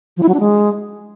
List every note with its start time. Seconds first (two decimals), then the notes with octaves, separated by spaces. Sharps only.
0.17 F3
0.23 E4
0.28 F#3
0.34 D4
0.40 G#3